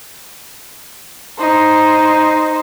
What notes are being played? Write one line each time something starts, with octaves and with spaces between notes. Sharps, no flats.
D#4 C5